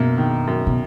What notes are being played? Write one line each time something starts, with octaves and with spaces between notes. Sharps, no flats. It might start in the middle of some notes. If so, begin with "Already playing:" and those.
Already playing: F#2 B2 A#3
D#3
F#2
B2